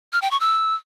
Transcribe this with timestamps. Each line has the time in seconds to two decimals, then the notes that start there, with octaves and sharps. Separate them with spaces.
0.13 F6
0.22 G5
0.31 C#6
0.40 E6